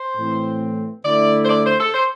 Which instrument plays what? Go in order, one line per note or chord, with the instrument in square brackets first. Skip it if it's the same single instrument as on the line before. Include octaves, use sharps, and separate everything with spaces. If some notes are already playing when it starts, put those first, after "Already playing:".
Already playing: [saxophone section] C5
[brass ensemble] A2 E3 C4
[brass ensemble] D3 A3 E4 [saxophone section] D5
[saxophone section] C5
D5
C5
A4
C5